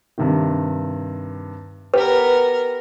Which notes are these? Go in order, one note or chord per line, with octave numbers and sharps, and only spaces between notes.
G2 C3 D#3
B3 G4 A#4 B4